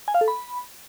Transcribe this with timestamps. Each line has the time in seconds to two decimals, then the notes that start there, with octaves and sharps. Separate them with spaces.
0.08 G#5
0.14 F5
0.21 A4
0.28 B5